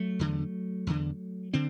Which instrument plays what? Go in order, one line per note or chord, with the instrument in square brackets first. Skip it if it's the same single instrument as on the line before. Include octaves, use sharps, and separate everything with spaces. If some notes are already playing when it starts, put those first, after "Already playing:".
Already playing: [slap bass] F#3 A3
E2 D3
E2 D3
D3 C4